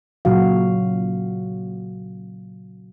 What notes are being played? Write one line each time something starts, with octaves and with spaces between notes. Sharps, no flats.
A#2 C#3 F#3 F#4 F5